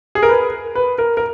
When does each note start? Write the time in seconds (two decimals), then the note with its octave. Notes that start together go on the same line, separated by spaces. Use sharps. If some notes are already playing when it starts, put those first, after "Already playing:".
0.15 G#4
0.23 A#4
0.29 B4
0.75 B4
0.98 A#4
1.17 A#4